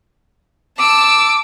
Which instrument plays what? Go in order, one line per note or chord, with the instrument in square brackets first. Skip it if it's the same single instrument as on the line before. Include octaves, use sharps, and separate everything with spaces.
[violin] A5 E6 [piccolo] D6